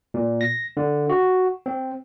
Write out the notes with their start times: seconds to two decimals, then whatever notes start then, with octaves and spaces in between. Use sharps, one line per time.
0.14 A#2
0.41 A#6
0.77 D3
1.09 F#4
1.66 C4